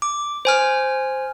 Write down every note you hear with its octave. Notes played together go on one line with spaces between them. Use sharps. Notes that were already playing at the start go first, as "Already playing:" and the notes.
D6
C5 G#5 F6